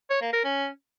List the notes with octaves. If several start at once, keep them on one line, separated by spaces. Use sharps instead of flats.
C#5
A#3
A#4
C#4